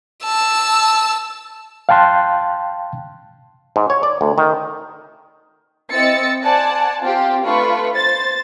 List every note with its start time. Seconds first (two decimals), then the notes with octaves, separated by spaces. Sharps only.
0.24 A5 E6
1.89 F5 G5 A5 C6 F#6
3.76 G#2
3.90 C#5
4.03 D5
4.21 D2
4.38 D#3
5.91 C4 E4 D#5 E6 A6 C#7
6.43 C5 D5 F#5 G#5 A5
7.02 C4 F4 G4
7.45 A3 D4 F4 B4 B5 C#6
7.93 C5 A6